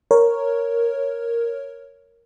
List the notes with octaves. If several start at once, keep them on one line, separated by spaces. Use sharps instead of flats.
A#4 C#5